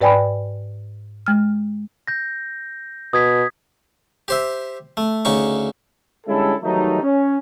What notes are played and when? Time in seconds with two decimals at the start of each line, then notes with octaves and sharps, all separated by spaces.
0.01 G#2 B4 D5 G5 G#5 B5
1.27 G#3 F6
2.07 G6 A#6
3.13 B2 D#6 G#6 B6
4.28 G4 C5 E5
4.97 A3
5.25 D2 C#3 D#4 C#6
6.27 D3 G3 G#3 C#4 E4 A4
6.63 D#3 E3 F#3 G3 A3 D#4
7.02 C#4